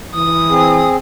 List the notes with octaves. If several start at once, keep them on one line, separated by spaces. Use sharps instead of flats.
E3 D#6
C4 G#4